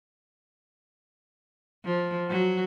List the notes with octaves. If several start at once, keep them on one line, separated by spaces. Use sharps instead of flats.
F3
F#3 F#4